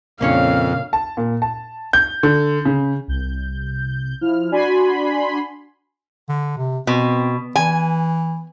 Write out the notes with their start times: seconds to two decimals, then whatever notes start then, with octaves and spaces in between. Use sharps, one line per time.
0.21 F2 A#2 C#3 A#3 C#4 D4 C#5 F5
0.93 A5
1.17 A#2
1.42 A5
1.93 G6
2.23 D3
2.65 C#3
3.08 C2 G6
4.21 F3 E4 F6
4.51 D4 F#4 D5 G#5 B5 C6
6.29 D3
6.57 C3
6.87 B2 C4
7.56 E3 G#5